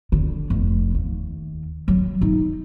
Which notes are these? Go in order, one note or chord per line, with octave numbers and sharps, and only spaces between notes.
D3
F1
D#2
F#3
D#4